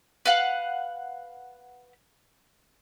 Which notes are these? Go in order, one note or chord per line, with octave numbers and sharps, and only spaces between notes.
B4 F5 F#5